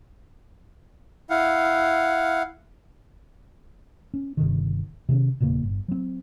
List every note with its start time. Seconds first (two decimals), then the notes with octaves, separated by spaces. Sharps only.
1.30 E4 F5 F#5
4.14 C#4
4.37 G1 C3 D#3
5.09 C3 D#3 C4 C#4
5.40 E1 A#2 C#3 A#3
5.63 G1
5.88 F#3 C4